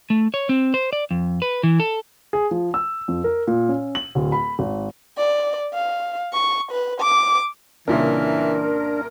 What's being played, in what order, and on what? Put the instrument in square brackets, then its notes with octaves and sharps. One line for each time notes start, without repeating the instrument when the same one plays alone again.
[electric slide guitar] A3
C#5
C4
C5
D5
F2
B4
E3
A4
[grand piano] G#4
F3
E6
F2
A#4
A#2
C#4
F#7
D1
B5
G#1
[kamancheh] D5
F5
C#6
B4
D6
[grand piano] C2 A#2 C#3 [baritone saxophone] E3 [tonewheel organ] D4 [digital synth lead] A#4